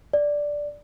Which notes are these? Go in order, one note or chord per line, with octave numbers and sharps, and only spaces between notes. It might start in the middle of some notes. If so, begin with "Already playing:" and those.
D5